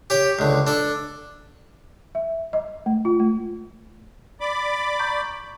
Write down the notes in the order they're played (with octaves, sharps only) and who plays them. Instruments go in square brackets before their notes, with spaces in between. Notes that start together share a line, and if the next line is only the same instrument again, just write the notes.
[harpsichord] G4 C#5 G5
C#2 D3
D4 A4
[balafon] E5
D#5
A3
F4
A3
[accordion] D5 B5 D6
[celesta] A#5 C#6 G6